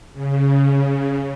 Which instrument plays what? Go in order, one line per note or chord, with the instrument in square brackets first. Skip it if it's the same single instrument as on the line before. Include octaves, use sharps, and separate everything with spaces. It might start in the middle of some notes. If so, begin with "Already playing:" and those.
[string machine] C#3